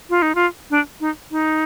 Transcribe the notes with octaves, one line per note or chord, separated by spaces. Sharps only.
F4
D#4
F4
D4
D#4
D#4